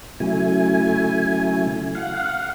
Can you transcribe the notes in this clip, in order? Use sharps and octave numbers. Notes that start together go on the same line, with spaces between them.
C#3 F#3 A3 E4 G#5
F5 F#5